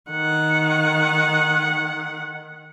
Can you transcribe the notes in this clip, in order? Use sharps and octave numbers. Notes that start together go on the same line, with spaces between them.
D#3 F#5